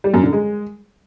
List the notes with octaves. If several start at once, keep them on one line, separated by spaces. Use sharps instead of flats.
G3
F#2
D3
G#3